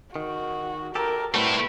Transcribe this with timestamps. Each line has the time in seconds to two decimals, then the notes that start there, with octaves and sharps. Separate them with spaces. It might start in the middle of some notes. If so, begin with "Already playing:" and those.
0.16 D#3 F#4
0.95 G4 A4 A#4
1.34 G3 A3 C4 E4 F#4 B4